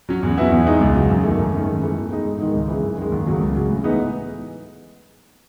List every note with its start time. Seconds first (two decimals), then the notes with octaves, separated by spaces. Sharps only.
0.09 F#3 C#4
0.23 E2
0.37 B2 F#3 B3 E4
0.52 E2
0.66 B2 G#3 D#4
0.81 C#2
0.96 C#3 F#3
1.09 F#2
1.23 D#3 A3
1.39 F#2
1.53 D#3 A3 C#4
1.67 G#2
1.81 E3 A3
1.95 B2
2.11 G#3 D#4
2.25 G#2
2.39 D#3 G#3 D#4
2.54 C#2
2.68 C#3 E3
2.82 F#2
2.97 D#3 G#3
3.12 D#2
3.26 C#3 F#3 A3
3.41 C#2
3.55 C#3 F#3
3.70 A2
3.83 E3 G#3 B3 D#4